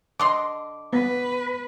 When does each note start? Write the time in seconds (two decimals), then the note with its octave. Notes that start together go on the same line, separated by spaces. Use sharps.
0.20 D3 D#5 C6 D6
0.93 B3 B4